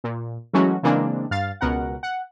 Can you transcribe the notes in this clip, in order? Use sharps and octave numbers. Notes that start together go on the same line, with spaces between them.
A#2
E3 F#3 G#3 A3 C#4 F#4
C#3 E3 G#3 A#3 C4 D4
G2 F5 A6
C#2 B2 A#4 F#5
F#5